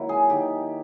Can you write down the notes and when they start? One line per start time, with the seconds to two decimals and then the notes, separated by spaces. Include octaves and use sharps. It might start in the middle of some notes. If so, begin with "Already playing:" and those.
Already playing: D#3 F#3 A#3 E4
0.09 G#4
0.30 D#3 G4